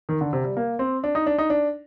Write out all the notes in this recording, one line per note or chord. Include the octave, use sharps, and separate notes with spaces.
D#3
D3
C3
G3
A#3
C4
D4
D#4
D4
D#4
D4